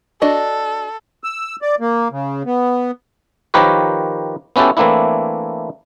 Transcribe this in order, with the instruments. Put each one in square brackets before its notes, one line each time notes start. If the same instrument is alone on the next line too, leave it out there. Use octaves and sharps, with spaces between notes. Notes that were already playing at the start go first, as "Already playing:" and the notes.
[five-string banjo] D4 F#4 D#5 [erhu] A4
[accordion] E6
D5
A#3
C#3
B3
[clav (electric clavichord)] D#3 F3 G4 A#4 B4 C#5
B3 C#4 E4 F#4 G4 A4
E3 A3 A#3 C4 D4 E4